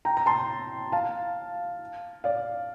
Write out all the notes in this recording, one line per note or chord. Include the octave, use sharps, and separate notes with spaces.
G5 A#5
A#5
A5 C6
F5 A5
D5 F5